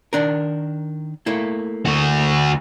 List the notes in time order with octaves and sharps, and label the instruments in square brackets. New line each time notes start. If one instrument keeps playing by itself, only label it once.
[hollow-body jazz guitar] D#3 D4 A#4
A3 A#3 E4
[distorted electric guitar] D2 F#4